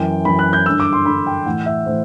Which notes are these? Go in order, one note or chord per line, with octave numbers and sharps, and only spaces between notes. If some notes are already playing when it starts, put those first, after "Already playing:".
Already playing: F#2 E3 G5
F#2 E3 B5
F#6
G6
G2 D3 E6
D6
C6
G2 D3 B5
G5
A2 E3 F#5
E5
A2 E3 C5